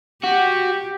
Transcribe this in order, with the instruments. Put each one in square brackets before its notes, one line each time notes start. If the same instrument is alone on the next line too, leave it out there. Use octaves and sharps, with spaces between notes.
[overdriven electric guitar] F#4 [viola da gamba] G4